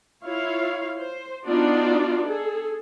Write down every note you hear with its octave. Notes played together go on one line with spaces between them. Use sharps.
E4 F4 C#5 F5
C5
B3 D4 D#4 F4 F#4 D5
G#4 A4